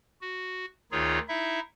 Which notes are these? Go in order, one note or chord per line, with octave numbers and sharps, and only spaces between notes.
F#4
D2 D#3 D#4 F4 G#4 C#5
D#4 E4 E5